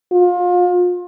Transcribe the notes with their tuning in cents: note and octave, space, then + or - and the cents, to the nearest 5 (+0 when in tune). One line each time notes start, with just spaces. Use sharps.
F4 +30